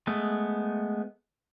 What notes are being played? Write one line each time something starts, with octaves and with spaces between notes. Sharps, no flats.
G#3 A3 B3